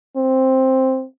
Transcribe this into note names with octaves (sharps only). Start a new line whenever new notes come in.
C4